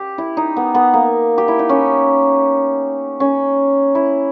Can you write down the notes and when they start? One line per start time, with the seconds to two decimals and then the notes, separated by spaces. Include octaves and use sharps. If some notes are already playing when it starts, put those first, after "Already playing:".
Already playing: G4
0.18 E4
0.37 D#4
0.57 B3
0.74 B3
0.94 A#3
1.38 G4
1.48 E4
1.59 D#4
1.69 C#4
3.20 C#4
3.95 E4